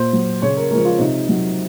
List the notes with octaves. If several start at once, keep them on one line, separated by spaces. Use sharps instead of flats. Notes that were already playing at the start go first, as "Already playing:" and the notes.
Already playing: A#2 C5
F#3
C#3 C#5
A#4
F3 G#3 A#4
F4
C3 D#4
F#3